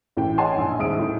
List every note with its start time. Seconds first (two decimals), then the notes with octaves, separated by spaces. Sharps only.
0.17 A1 A2 E3 G5
0.38 C#5 D#5 F#5 G#5 A5 C6
0.58 A#1
0.79 D#1 G#2 E5 D#6 D7
0.99 A2